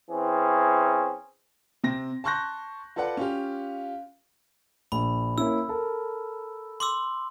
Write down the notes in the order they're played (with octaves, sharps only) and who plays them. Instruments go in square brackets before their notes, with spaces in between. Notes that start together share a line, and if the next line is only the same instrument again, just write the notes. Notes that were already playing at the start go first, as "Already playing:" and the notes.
[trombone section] E3 C4 C#4 G#4
[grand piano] C3 C4 A#6
A5 C6 C#6 F#6 G6 A#6
F4 A4 B4 D5 F#5
C#4 F4 G4
[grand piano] A#1 [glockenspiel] B5
[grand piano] A#3 C#4 E4 [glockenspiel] E6
[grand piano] A4 A#4
[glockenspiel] C6 D6 E6